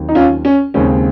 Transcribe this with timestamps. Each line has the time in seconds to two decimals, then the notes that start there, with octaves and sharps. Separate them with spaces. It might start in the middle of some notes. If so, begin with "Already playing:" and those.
Already playing: D#2 D#3 F#3 C4
0.09 D#4
0.15 C#4 F4
0.45 C#4
0.74 D#2 C#3 G#3 C4 C#4